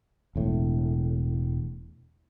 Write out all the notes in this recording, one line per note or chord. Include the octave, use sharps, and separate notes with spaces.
E1 A2